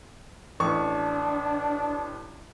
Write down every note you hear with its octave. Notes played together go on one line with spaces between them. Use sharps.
A1 D4 C#6